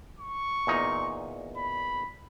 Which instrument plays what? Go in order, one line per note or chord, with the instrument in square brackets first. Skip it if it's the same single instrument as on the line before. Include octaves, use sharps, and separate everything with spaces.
[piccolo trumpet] C#6
[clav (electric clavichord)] E2 A#2 D#4
[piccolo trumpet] B5